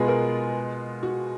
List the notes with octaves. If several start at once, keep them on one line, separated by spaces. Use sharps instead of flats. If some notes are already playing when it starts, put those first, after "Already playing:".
Already playing: B2 G#3 B3 F4 G#4 B4
A#4
F#4